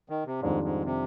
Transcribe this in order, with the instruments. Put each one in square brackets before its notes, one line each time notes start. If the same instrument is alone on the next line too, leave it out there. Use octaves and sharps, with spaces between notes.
[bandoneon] D#3
C3
[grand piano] F2 D#3 G3 D4 F4 [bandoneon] G#2
[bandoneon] G#2
C3